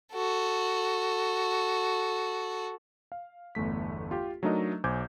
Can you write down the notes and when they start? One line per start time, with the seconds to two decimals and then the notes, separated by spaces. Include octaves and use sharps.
0.13 F#4 A4
3.12 F5
3.55 G1 E2 A3 B6
4.11 F4 G4
4.43 F#3 A3 D4 D#4 A#4 D#5
4.84 B1 C5 G#5 D6 G6 G#6